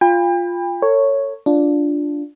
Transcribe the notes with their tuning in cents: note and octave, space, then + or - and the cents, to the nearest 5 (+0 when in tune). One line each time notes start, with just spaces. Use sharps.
F4 +0 G5 +40 B5 +0
A4 +40 C#5 +0
D4 -5 F4 +0